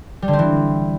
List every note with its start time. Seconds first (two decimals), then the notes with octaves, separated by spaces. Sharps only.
0.22 G3
0.28 D3
0.33 C4
0.39 E3